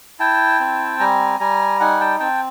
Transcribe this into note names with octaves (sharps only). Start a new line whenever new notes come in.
E4 G5 A5
C4
G3 G#5 A#5
G3 G#5 A#5
D#4 F#5 G#5
G5 A5
C4 G5 A5